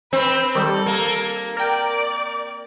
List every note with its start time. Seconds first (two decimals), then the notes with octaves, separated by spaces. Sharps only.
0.13 C4 B4
0.55 D#3 G3 A4
0.86 A#3
1.57 A#4 D5 G5